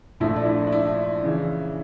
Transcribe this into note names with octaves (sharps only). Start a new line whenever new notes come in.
A#1 A#2 F3 A3 E4
D4
E4
D4
E4
C#3 E3